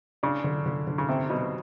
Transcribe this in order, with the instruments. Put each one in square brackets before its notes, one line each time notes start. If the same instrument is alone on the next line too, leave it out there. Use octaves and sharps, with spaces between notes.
[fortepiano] C#3 [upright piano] D4
[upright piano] D3
D3
D3
[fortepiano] C#3
[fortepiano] C3 [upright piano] C4
[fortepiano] B2 [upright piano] F#3